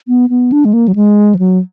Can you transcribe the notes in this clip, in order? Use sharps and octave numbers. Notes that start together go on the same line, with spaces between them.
B3
B3
D4
G#3
A#3
F#3
G#3
F3
F#3